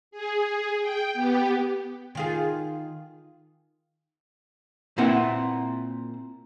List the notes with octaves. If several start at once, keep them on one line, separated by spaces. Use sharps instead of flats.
G#4
G5
B3 G4
D#3 F4 G#4
A#2 A#3 C4 E4 B4 F#5